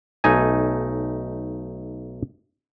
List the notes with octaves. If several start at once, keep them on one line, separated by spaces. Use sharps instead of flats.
B1 A3 D#4 G#5